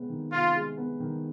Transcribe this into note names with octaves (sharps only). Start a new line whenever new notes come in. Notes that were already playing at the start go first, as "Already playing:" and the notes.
Already playing: C3 G#3 B3
D#3
C3 F4
G#3
B3
D#3